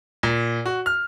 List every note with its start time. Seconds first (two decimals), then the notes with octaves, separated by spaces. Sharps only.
0.23 A#2
0.66 F#4
0.86 F6